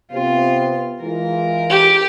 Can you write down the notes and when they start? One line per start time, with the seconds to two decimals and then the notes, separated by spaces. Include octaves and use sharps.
0.12 C3 B3 C4 F4
1.02 E3 G#3 F4 A#4
1.70 G4